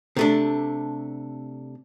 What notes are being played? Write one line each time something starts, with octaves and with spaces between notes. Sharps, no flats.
C3 A3 D4